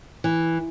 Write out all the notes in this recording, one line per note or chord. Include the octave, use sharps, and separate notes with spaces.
E3